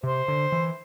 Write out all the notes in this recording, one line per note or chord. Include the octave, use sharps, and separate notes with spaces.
C3 C5
D3
E3